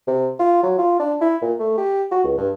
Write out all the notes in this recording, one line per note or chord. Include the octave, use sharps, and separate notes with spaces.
C3
F4
F#3
F4
D4
E4
A#2
A3
G4
F#4
C#2
G2